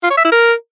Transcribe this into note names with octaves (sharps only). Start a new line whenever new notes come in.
F4
C#5
E5
E4
A#4